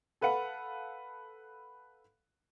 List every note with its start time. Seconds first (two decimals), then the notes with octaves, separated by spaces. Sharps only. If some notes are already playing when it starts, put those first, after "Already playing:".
0.21 A4 B4 F5 F#5